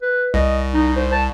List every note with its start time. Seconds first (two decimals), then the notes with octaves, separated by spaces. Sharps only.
0.02 B4
0.34 C2 D#5
0.74 D#4
0.97 C5
1.12 A5